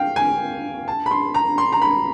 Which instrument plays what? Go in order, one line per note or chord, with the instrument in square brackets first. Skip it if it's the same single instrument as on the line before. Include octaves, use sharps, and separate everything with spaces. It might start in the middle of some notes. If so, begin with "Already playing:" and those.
Already playing: [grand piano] F5 G5
G#5
A5
B5
C6
A#5
C6
A#5
B5